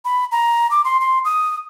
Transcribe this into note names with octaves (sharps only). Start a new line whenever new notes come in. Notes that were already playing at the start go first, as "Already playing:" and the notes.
B5
A#5
D6
C6
C6
D#6